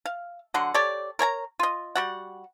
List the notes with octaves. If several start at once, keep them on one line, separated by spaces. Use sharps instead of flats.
F5
D3 F#3 F#5 C6
G4 A4 C#5 D5
A#4 C#5 G#5 A#5
F4 D#5
G3 F#4 F#5